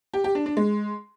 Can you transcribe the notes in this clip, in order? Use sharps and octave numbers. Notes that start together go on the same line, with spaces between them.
G4
G4
D4
D4
G#3